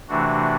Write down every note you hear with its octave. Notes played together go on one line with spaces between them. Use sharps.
C3 E3 A3 D4 F#4